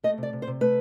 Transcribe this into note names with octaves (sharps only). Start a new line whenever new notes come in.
A3 D#5
C3 D5
C3
C5
C3
A3 B4